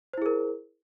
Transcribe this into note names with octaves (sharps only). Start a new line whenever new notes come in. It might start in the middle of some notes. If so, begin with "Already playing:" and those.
E4 G#4 A#4 C5